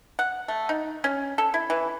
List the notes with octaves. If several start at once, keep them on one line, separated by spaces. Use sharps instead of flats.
F#5
A3
D#4
C#4
A4
E4
E3